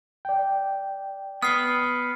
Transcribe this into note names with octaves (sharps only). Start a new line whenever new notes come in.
D5 G5
B3 D#6 F6 C7